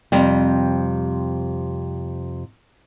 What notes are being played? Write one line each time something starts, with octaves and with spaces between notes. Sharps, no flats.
F2 C3 G3